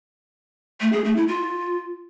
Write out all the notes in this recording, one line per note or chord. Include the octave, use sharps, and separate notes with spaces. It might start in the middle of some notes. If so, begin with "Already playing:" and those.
A3
G#4
A3
E4
F4